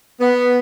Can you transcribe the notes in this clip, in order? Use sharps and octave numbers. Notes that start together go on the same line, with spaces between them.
B3